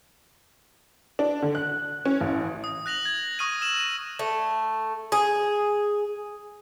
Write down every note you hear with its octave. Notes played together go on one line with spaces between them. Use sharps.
D4
D3
F#6
C#4
A1
D#6
F#6 A#6 F7 F#7
G#6
C#6 D#6 F6 A#6 D#7
E6 E7 F#7
A3
G#4